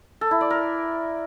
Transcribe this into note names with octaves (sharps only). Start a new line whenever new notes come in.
A4
E4
D5
A#4